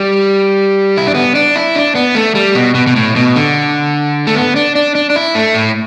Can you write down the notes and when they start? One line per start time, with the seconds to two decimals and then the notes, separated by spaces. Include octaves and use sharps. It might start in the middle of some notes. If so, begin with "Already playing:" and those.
Already playing: G3
0.98 E4
1.07 D4
1.14 B3
1.35 D4
1.56 E4
1.75 D4
1.95 B3
2.15 A3
2.35 G3
2.55 B2
2.75 B2
2.87 B2
2.96 A2
3.16 B2
3.36 D3
4.27 A3
4.35 B3
4.56 D4
4.75 D4
4.95 D4
5.10 D4
5.16 E4
5.35 A3
5.55 A2